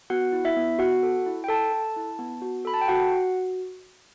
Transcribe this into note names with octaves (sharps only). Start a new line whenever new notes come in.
B3 F#4 F#5
E4
E4 E5
B3
B3 F#4 F#5
A4
E4
G5
A4 A5
A4
E4
B3
F#4
A4 B5
A5
G5
F#4 F#5
F#4